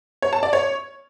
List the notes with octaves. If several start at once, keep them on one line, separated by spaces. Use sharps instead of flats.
C#5
A5
D5
C#5